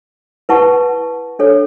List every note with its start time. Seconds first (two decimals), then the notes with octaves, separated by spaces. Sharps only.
0.49 E4 B4 F#5 A5 C#6
1.39 D4 A4 C#5